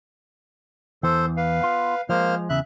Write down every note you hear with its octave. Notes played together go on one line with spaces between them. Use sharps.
E2 E3 A4 C5
B4 F5
B3 F4
F3 G#3 A#3 C5 F6
E2 C#3 E5 F#6